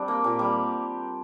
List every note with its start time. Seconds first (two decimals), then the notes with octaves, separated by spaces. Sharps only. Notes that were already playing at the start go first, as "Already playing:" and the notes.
Already playing: G3 C4 D4
0.08 A#3
0.24 A#2
0.39 G3